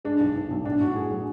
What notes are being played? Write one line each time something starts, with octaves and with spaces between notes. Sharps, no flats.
G#3 D4
B1
B1
B1
A2 D4
A2 F#4
A2 G#4
F#3 G#4